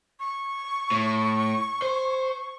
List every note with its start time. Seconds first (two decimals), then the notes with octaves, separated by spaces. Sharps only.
0.19 C#6
0.91 A2
1.82 C5